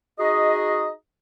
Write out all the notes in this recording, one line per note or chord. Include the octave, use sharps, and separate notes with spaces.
D#4 F#4 G#4 D#5